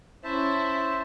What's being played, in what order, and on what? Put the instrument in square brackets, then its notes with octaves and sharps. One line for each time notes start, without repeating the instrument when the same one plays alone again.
[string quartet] C#4 E4 [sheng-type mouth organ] C5 E5 A5